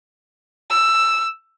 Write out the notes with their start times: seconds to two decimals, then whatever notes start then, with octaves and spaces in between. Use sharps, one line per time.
0.70 E6